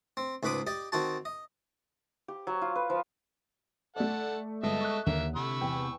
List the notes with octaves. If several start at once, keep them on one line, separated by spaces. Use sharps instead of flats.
C4
C#2 G#2 B4 B5 D6 D#6
G4 D5 D#5
D#3 C4 F#4 A5
D#5
G4
F#3
F4
B4
F3
A3 A4 D5 F#5
G1 G#3 A4 D#5 E5
C#6 F#6
D#2 D3 A#3 E5
C3 B5 C#6 E6
E2 G5